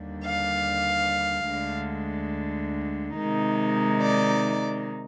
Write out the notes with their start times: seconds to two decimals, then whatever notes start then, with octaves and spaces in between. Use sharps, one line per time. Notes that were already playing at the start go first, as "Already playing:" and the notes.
Already playing: D#2 D3 G3
0.25 F5
1.51 D2 D3 G#3
3.18 C3 D#3 G#3 D#4
4.01 D5